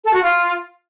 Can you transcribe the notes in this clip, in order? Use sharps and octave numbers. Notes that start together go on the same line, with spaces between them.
A4
F#4
F4